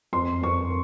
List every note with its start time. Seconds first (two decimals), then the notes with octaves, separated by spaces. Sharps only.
0.13 F2 C6
0.43 F2 C#6